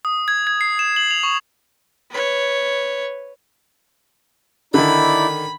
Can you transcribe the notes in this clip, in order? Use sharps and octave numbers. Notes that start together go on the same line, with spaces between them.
D#6
G#6
G#6
C7
E7
F#7
F7
C#6
B4 C#5
D3 D#3 D#4 E4 D5 B5